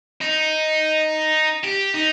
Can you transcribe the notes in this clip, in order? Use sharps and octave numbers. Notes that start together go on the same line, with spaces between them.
D#4
G4
D#4